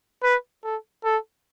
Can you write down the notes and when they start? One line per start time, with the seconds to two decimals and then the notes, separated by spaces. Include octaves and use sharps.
0.23 B4
0.64 A4
1.04 A4